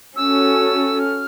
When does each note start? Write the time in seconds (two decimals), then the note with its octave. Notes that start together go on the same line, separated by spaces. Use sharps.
0.16 C#4 F#4 A4 E6
1.00 F6